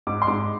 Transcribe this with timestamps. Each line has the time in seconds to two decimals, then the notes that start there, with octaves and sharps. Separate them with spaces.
0.07 G#2 D6
0.22 C6
0.27 G#2 D6